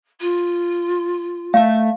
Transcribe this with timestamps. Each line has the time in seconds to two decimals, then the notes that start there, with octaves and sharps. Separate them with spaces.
0.20 F4
1.54 A3 E5 F5